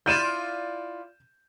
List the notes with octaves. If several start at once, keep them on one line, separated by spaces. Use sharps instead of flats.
E4 F4 D5 G6 D#7 E7